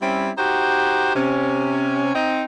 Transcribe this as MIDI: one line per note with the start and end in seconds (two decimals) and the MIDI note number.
0.01 0.30 55
0.01 0.30 60
0.01 0.30 61
0.01 0.30 64
0.38 1.11 63
0.38 1.11 66
0.38 1.11 67
0.38 1.11 72
1.15 2.14 48
1.15 2.14 61
2.14 2.44 60
2.14 2.44 63